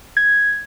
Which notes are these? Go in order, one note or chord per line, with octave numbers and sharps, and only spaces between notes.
G#6